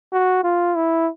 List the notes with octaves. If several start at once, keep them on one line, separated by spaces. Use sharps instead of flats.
F#4
F4
E4